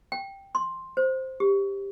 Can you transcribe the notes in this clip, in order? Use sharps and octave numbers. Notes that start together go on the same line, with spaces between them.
G5
C6
C5
G4